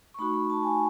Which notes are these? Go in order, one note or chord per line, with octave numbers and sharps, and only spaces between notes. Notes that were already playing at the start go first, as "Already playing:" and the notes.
C#6
A3 D#4 F#4 B5
B5
A5
G#5